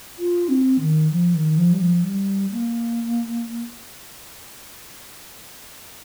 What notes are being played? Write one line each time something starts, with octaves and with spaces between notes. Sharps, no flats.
F4
C4
D#3
F3
D#3
F3
G3
F3
G3
A#3